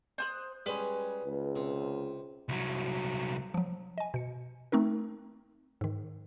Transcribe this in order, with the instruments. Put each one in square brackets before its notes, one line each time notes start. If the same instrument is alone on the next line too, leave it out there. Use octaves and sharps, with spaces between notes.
[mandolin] C5 D#6 F#6
[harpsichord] G3 G#3 C#4 [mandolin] B4
[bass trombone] C#2
[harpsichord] C3
[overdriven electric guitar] C2 F#3
[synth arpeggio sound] F3 F#3
D#5 G#5
B2 C#7
A3 C4 D#4 A#4
G#2 D#3